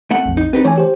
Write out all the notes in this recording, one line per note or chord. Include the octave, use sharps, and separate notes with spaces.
A3 C4 F#5
A#1 F2
D#4
C4 D#4 G4 B4
E3 A3 C#5 G#5
G4 C5